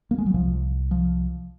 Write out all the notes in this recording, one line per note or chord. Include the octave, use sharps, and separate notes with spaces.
A#3
G#3
F#3
C2 C3 F3
F3